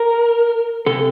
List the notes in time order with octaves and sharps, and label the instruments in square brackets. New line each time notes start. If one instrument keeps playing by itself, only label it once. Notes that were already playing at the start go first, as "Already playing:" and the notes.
Already playing: [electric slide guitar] A#4
C3 A4